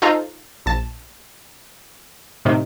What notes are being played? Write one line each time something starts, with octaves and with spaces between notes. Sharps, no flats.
D#4 F4 A4 C5 A#5
A#1 A5
A2 C3 D#3